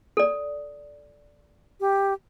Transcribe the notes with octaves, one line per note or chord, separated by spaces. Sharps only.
A4 D5
G4